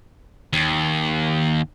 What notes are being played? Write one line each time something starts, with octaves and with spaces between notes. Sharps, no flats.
D#2